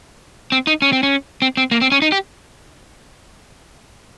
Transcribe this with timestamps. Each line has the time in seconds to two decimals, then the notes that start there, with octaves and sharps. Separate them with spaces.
0.52 C4
0.67 D#4
0.82 C#4
0.93 C4
1.03 C#4
1.42 C4
1.57 C4
1.71 A#3
1.81 C4
1.92 C#4
2.02 D#4
2.12 G4